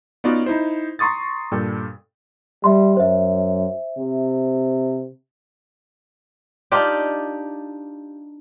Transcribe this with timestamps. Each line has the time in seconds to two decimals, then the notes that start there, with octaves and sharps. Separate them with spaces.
0.24 B3 C#4 D#4 F4 F#4 D5
0.46 D#4 E4 C5
0.99 A#5 C6 C#6 D#6 A6
1.51 G2 A#2 A4 D5 G5
2.64 G3 E5 C6
2.97 F#2 C5 E5
3.98 C3
6.72 D4 D#4 F4 G4